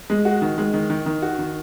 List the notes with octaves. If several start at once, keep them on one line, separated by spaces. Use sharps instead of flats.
G#3
F#4
D#3
G#3
D#3
D#3
D#3
F#4
D#3